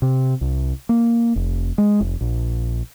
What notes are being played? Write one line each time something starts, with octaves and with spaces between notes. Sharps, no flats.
C3
C2
A#3
F1
G#3
F1
A#1